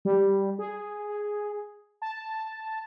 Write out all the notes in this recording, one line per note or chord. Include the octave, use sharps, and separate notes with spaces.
G3
G#4
A5